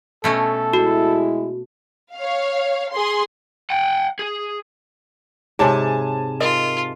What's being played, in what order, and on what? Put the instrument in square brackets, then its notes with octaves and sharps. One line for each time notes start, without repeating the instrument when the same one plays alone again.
[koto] B2 A3 C#4 [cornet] A4
[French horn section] G#3 E4 [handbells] F#4
[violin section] C#5 F5
G#4 C6
[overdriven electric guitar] F#5 G5
G#4
[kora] G#2 C3 [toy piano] G#4 C#5 [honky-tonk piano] G#5 A5
[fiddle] F4 [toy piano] A#4 D#5 D#6